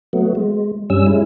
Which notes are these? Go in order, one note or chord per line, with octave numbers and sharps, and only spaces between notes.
F#3 A3 B3
G#3
G2 G3 C#4 E6
G#3 C#4 E4